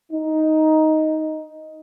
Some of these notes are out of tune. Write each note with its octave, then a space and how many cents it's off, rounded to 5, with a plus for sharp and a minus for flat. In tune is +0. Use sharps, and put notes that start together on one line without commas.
D#4 +5